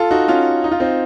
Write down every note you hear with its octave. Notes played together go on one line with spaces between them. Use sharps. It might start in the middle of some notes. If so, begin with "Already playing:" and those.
Already playing: F4 A4
D#4 F#4
C#4 F4
D#4
F4
C4 D#4